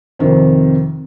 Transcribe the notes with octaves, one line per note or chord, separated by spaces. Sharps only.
F2 C3 D#3 C4